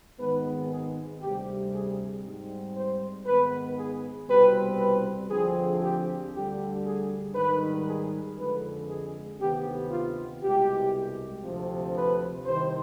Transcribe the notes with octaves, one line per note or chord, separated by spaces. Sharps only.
G#1 G#2 D#3 G#3 B3 B4
G#4
D2 C3 G3 G4
G#4
G#2 G3 C4
C5
G#2 D#3 B3 B4
G#4
C2 B2 G3 C4 B4
B4
D2 D3 F3 C4 G#4
G4
D2 D3 G3 G4
G#4
G#2 D#3 G3 B4
G#4
F2 D3 G#3 B4
G#4
D2 C3 D#3 B3 G4
F4
C2 B2 G#3 G4
D2 C3 F3
B4
C2 C3 D#3 C5